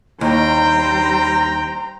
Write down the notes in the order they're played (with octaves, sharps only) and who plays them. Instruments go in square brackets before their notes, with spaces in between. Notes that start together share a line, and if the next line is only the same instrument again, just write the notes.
[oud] D#2 [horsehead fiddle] G3 C5 [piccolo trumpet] G5 [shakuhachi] A#5